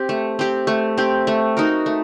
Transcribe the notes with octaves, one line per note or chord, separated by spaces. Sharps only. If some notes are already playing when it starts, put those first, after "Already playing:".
Already playing: C4 G4
A3
C4 G4
A3
C4 G4
A3
D#4 F#4 A#4
A3